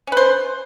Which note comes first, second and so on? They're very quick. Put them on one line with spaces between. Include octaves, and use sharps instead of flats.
C#4 B4 C5